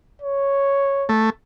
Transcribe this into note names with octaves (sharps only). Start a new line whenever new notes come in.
C#5
A3